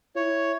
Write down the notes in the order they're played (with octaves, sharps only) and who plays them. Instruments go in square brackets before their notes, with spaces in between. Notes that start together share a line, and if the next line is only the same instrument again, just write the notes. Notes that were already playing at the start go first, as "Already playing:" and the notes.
[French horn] E4 [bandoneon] C#5